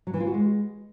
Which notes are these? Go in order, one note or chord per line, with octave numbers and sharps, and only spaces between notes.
F#3
E3
F4
F#4
G#3